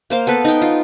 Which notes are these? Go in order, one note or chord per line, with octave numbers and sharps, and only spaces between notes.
A#3 C5 F5
B3 A4 B4
D#4 G5
F4